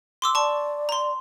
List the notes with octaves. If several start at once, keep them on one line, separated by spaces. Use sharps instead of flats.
C6 D6 E6
D5 A5 C#6
A#5 C6